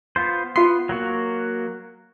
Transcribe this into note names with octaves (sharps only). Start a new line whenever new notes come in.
B3 F4 C5
B3 F4 C6
F#3 A#3 F#4